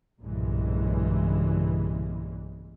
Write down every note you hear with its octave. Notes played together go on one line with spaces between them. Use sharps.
B1 G2 A#2 C#3 E3 G#3